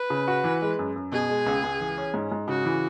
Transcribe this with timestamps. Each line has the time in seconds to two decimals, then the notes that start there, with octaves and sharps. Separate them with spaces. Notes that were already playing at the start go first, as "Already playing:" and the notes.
Already playing: B4
0.10 C#3
0.28 F#4
0.44 E3
0.62 G#3
0.79 F#2
0.96 F#2
1.12 B2 G#4
1.30 G#3
1.46 C#2
1.64 C#2
1.81 E3
1.98 C#4
2.14 G#2
2.32 G#2
2.48 C#3 F#4
2.65 E3